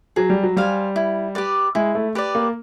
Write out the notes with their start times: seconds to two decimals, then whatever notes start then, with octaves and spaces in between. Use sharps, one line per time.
0.16 F#3 G#4
0.30 G3
0.43 F#3
0.56 G3 C5 F5 G#5
0.96 E4
1.35 G4 B4 D5
1.75 G#3 E4
1.95 A3
2.15 G4 B4 D5
2.35 A#3